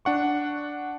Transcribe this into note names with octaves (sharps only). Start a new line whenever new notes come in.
D4 F#5 C#6